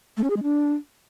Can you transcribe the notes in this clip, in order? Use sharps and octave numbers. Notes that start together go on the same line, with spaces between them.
A3
C#4
G#4
G#3
D4